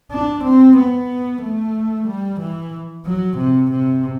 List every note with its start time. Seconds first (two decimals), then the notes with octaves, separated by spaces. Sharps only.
0.12 D4
0.44 C4
0.77 B3
1.42 A3
2.08 G3
2.40 E3
3.06 F#3
3.37 C3
3.71 C3